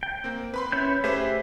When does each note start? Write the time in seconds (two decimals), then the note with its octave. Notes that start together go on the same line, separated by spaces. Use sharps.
0.03 G5
0.24 A#3 C4
0.54 B4 B5 C6
0.72 C#4 E4 G6
1.04 A3 G4 G#4 B4 C5 E5